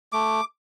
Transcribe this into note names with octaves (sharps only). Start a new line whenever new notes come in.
A3 D6